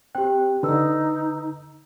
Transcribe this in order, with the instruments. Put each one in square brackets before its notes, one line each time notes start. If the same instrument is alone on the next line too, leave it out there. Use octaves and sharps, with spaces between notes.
[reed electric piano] C4 F#6 [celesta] G4 G5
[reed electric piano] D3 [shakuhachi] D#4 [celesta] B4 E6